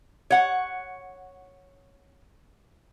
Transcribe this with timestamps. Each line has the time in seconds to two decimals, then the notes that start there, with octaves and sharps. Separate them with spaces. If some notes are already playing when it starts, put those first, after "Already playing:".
0.30 C#5 F#5